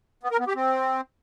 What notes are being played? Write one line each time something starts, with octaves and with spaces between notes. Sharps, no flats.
B3
A#4
B3
G4
C4